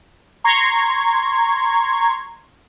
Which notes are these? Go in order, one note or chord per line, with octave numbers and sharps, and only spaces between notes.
A#5 C6 C#6 G#6